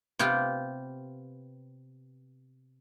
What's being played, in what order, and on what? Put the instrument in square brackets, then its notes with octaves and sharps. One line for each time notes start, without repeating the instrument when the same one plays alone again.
[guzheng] C3 B3 F4 G4